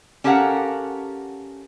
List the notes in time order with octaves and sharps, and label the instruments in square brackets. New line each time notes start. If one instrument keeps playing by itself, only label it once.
[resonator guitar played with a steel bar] C#4 G4 A4 A#4 F5 F#5